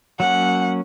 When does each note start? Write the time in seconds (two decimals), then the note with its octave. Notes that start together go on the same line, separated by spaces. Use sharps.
0.20 F#3 A#3 C#4 F#5